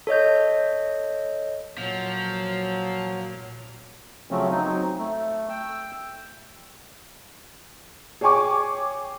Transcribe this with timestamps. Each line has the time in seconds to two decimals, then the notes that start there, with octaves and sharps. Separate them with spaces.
0.07 A4 C#5 D#5 G6
1.78 A#2 F3 F#3
4.31 C#3 F3 F#3 A3 C4 C#4
4.51 F#3 C4 D#4
4.99 A3
5.49 G5 E6
8.21 G#4 C#5 G5 G#5 C#6 D6